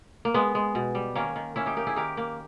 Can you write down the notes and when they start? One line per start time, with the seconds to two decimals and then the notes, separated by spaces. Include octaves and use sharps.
0.25 A#3
0.34 G#3 B3
0.55 G#3
0.75 B2
0.95 G3
1.15 D#3 A#3 C#4
1.36 D#3
1.56 A#3 C#4 E4
1.66 D#4 G4
1.77 A#3 G4 A#4
1.87 E4 G#4
1.96 D#3 G4 A#4
2.17 A#3